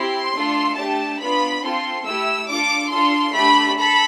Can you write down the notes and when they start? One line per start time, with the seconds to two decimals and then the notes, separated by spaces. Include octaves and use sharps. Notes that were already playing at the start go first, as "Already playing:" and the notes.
Already playing: C4 E4 G4 C6
0.34 A3 D4 F4 A4
0.77 A3 D4 G4 A5
1.19 B3 D4 F4 B5
1.62 C4 F4 A4 C6
2.04 A3 E4 G4 E6
2.48 D4 F4 A4 D6
2.90 D4 F4 A4 C6
3.33 A3 D4 G4 B5
3.76 A4 B5